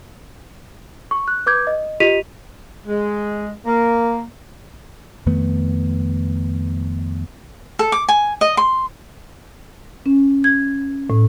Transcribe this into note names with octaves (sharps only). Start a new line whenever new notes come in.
C#6
F#6
B4 D6 G6 G#6
D#5
F4 G4 D#5 B6 D#7 F7
G#3
A#3
F2 D#3 A3 B3
A4
D6
G#5
D#5
C6
C#4
G#6
A2